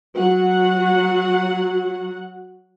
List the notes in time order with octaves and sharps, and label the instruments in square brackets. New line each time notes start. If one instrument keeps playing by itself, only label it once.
[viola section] F#3 F#4 F#5